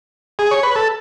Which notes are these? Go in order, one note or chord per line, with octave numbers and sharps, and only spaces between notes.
G#4
C#5
B4
A4